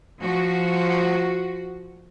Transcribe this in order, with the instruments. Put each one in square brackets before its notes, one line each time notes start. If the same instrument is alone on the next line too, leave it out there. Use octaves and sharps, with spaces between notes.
[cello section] F3 F#4